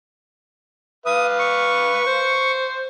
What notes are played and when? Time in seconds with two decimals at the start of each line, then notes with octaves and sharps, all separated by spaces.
1.06 B4 F5 D#6
1.39 C#6
2.07 C5